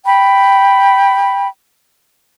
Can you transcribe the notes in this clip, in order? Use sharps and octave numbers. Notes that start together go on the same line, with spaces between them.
G5 B5